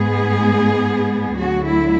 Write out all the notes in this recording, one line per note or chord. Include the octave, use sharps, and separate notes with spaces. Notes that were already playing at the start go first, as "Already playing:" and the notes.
Already playing: G#2 G#3 B3 G#4
D2 D3 F#3 F#4
E4